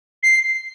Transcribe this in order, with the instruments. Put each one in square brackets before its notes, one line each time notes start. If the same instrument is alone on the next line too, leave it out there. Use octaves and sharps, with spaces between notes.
[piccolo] C7